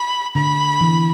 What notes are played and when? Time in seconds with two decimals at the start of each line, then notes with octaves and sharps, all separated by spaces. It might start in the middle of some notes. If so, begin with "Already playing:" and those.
Already playing: B5
0.35 D3 B5
0.81 E3